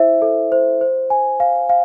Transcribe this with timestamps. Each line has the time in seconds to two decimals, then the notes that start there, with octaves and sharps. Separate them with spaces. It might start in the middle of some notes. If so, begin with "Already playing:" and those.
Already playing: E4 C5 E5
0.22 A4
0.52 C5
0.81 C5
1.10 G#5
1.40 F5
1.69 F5